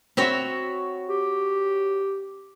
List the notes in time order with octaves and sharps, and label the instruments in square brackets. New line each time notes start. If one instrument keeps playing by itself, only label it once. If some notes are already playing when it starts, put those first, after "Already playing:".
[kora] C4 E5 [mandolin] F#4 C#5 B5
[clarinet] G4